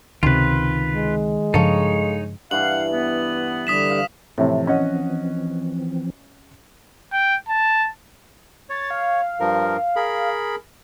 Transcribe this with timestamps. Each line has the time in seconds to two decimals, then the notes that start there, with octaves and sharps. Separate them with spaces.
0.23 C#2 C3 D#3 F4 B4
0.94 G#3
1.54 G2 C#3 F3 D#4 A4 C#5 F5
2.51 G2 E3 F5 F#5 F#7
2.92 B3
3.67 D3 G3 D4 D#6 B6 E7
3.90 F5
4.38 A2 C3 E3 F3 C4
4.67 C#4 D#5 F#5
7.13 G5
7.49 A5
8.69 C#5 A6
8.91 F5
9.40 G2 F3 A#4
9.96 G#4 A#4 B5